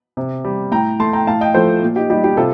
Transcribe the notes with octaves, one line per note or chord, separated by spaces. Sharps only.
C3
G3
A2 G5 A#5
A3 A5 C6
G5 A#5
A2 F5 A5
D#5 G5
F3 A3 A4 C5
A#2
D#4 G4
G3 D#4 G4
D#4 G4
C3 F4 A4